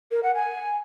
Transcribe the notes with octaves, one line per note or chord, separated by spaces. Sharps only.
A#4
F#5
G#5